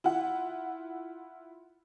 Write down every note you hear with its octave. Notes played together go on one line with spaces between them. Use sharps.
E4 F4 F#5